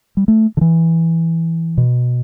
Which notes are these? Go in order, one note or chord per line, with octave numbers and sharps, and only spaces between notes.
G3
A3
D3
E3
B2